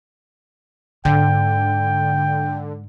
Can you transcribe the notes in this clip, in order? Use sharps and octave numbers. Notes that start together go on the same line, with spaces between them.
G#2 D3 G5